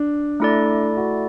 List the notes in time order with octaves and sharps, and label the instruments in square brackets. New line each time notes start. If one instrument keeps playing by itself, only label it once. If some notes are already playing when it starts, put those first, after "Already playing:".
Already playing: [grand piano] D4
[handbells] A3 E4 A4 D5
[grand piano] F#4